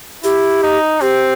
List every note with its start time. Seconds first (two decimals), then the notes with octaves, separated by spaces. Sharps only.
0.24 E4 G4
0.63 D#4
1.01 C4 G4